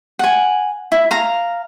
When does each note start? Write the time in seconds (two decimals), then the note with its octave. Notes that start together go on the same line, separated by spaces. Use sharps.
0.19 F#5 G#5
0.92 E4
1.11 F5 A#5